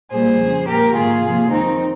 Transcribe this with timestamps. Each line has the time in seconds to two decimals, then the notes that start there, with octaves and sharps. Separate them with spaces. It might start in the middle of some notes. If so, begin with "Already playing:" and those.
0.11 A#2 G3 A#3 G#4 C5
0.39 F2 C#3 G#3
0.67 A#2 G#3 G4 A#4
0.95 G#2 D#3 A#3 F4 G#4
1.23 C3 F3 A#3
1.51 F2 D#3 G#3 C4 D#4